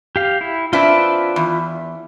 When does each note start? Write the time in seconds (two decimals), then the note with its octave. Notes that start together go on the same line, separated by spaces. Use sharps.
0.16 G4 F5
0.41 E4
0.73 C4 D4 E4 F4 B4 E5
1.36 E2